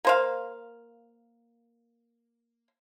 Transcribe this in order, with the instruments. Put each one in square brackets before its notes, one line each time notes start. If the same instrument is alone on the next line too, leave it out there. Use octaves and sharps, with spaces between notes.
[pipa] A#3 C5 F5